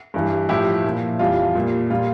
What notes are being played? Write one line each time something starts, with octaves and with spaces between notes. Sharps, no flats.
G2 E3 G3
A2 F3 E4 G4
A#2 F3
F2 E3 G3 F4
A#2 G3
A#2 G3 F4